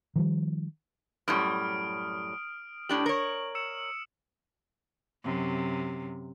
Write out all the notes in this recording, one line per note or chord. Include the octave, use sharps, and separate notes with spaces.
D#3 F3 G3
F#2 A2 G3 D#6 F6 D7
A2 D4 G4 F#7
A#4 C#5
E6 C#7 E7
F#2 C3